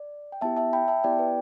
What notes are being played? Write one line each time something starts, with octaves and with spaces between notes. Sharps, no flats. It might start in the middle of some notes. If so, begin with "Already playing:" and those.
Already playing: D5
G5
B3 E4 G4 E5 A5
E5 A5
G5 B5
E5 A5
B3 E4 G4 D5 G5
B4